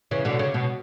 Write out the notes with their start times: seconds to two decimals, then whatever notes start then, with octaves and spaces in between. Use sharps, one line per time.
0.11 C#3 E3
0.25 B2 D3
0.39 C#3
0.54 B2